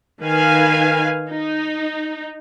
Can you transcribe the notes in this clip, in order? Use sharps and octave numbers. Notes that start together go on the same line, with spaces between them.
D#3 B4 F5 G#5
D#4